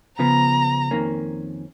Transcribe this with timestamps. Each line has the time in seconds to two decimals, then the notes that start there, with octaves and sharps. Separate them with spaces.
0.19 C#3 F3 B3 A#5
0.91 F2 D#3 A#3 C#4